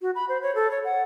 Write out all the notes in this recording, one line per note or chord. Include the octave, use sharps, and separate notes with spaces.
F#4
B5
C5
C#5
A4
C#5
F#5